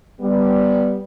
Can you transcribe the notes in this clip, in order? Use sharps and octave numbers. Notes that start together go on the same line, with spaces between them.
G3 B3